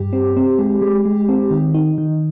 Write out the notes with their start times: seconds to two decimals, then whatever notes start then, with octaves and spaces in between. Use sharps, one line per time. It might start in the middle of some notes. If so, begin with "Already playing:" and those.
Already playing: G2 G4
0.13 C4
0.36 C4
0.59 G#3
0.81 G#3
1.05 G#3
1.29 C4
1.51 D#3
1.74 D#4
1.98 D#3